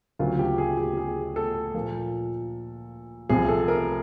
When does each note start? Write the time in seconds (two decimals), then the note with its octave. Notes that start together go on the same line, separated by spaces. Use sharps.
0.19 D2 C#3 F#3 A#3 F4
0.39 G4
0.58 G#4
0.78 G4
0.97 G#4
1.36 A4
1.74 A#2 F3 A#3
3.29 C2 C3 F3 G#4
3.49 A4
3.68 A#4